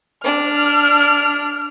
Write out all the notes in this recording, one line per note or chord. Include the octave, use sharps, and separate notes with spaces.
D4 F6